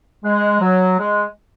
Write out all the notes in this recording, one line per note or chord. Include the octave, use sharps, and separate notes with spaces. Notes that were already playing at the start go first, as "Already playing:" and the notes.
G#3
F#3
G#3